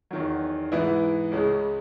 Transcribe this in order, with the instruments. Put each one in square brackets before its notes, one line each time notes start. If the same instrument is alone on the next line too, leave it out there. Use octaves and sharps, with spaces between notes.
[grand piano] E2 D#3 F#3
G#2 E3 B3 E4
C#2 C#3 G#3